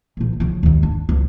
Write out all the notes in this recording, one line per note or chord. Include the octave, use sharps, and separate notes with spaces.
A#2 F3
C#3 F3
D#2 G#2
D4
C#2 F#3